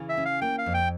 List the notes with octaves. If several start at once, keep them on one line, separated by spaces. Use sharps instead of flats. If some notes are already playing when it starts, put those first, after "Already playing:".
Already playing: C#3 E3
E5
C#4
F5
A#3 G5
F5
F2
G5